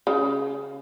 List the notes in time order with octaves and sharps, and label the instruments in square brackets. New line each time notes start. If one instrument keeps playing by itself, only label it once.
[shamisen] C#3